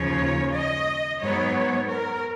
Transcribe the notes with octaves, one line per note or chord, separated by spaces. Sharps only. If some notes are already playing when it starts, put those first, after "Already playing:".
Already playing: D#2 C#3 F3 C#5
D#5
G#2 F#3 B3 C#5
A#4